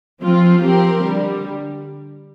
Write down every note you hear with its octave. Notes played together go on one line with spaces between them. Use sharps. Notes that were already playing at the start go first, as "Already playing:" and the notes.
F3 C4 F4
F3 C4 G4 A#4
D3 G3